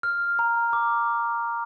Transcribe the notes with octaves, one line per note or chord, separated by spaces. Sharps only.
F6
A#5
D6